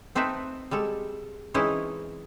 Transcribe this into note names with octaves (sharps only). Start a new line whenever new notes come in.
A3 C4 D#4 A4 B4 E5
G3 G#3 A4
E3 G#3 C4 C#4 D#4 E4